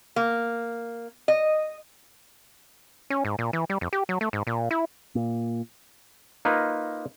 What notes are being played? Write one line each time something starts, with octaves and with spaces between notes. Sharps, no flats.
A#3
D#5
C#4
G#2
A#2
E3
G3
F2
G4
F#3
A3
G#2
A#2
E4
A#2
A#3 D#4 F4 B4